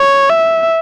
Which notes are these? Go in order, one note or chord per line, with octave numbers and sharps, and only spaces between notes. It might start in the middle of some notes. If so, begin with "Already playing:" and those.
Already playing: C#5
E5